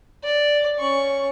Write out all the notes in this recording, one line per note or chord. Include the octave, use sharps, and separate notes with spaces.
D5
C#4 C#6